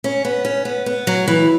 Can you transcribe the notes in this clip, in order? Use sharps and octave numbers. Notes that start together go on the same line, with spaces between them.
C#4
B3
C#4
B3
B3
F#3
E3